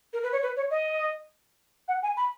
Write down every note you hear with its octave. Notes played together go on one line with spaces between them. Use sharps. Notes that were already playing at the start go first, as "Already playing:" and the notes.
A#4
B4
C#5
B4
C#5
D#5
F#5
G#5
B5